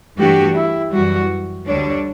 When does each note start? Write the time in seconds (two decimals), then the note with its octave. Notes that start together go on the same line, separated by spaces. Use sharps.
0.18 G2 E3 A3 D4 F#4 G4
0.55 E4
0.92 F#2 E3 G3 F#4
1.67 D2 D3 G3 D4 C#5